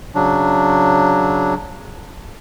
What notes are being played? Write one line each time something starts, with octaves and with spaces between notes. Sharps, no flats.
C#3 F#3 D4